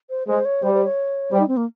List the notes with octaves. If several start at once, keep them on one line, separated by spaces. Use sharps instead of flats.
C5
G#3 C5
C#5
G3 C5
C5
C#5
G3 C5
D#4
C4
A#3